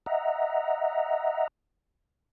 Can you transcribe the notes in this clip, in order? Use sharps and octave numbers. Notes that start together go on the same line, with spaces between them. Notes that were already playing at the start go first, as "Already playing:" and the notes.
D#5 E5 F#5 A#5